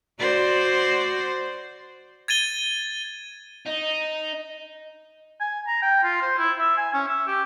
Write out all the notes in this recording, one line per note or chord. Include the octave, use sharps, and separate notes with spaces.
F#4 C5 D5
G#6 A6 D#7 G7
D#4
G#5
A#5
G5
F4
C5
E4
E5
G#5
C#4
E5
G4